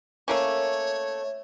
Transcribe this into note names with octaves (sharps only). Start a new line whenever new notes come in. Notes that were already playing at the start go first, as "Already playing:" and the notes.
A3 A#3 C#4 C#5